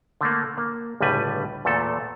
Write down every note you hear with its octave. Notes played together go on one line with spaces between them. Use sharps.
D3 A3 A#3
A#3
G1 C#2 A2 G3 B4 G#5
E2 A#2 A3 A4